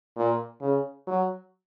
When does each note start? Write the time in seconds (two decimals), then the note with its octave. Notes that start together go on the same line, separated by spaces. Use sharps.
0.17 A#2
0.62 C#3
1.07 F#3